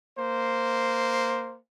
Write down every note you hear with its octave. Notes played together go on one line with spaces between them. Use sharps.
A#3 C5